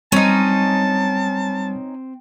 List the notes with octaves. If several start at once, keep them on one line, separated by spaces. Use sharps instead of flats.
G3 C4 C#4 D#4 A5